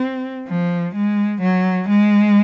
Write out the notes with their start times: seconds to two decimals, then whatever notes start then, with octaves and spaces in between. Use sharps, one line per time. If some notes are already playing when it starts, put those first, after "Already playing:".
Already playing: C4
0.48 F3
0.95 G#3
1.41 F#3
1.88 G#3